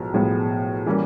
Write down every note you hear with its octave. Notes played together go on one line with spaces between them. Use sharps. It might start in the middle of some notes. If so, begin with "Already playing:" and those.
Already playing: B1 A2 F3 G#3 B3
B1 A2 F3 G#3 B3
E3 G3 A#3 C#4